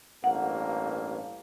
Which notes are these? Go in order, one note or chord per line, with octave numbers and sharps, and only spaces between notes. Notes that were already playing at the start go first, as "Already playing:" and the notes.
A1 G2 A#3 F#5